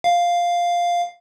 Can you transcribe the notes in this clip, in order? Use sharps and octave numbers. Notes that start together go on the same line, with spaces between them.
F5